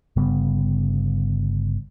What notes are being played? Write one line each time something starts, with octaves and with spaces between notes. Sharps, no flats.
G1 C#3 G3 B3